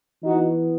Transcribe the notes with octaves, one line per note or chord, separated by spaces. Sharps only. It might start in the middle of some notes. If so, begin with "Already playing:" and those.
E3 B3 D#4 F#4